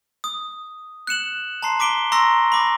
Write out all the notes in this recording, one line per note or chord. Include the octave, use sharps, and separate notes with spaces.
D#6
F#6 C#7 E7 F#7
A5 A#5 C6 C7
A5 D6 B6 D7 G7
A#5 C6 C#6 E6 A#6
B5 D6 A#6